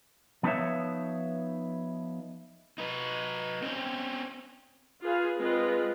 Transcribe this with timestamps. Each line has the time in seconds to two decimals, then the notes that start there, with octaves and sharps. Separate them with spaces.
0.43 F3 B3 D#4 B4 C#5 E5
2.78 D#4 B4
3.62 C4 C#4
5.02 F4 G#4 B4 F5
5.39 G#3 C4 F4 B4 D#5